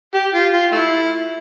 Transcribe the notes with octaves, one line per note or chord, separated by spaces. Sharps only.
G4
F4
F4
A3 E4